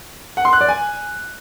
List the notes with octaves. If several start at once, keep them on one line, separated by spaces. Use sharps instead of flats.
F#5
C6
F#6
D5
G#5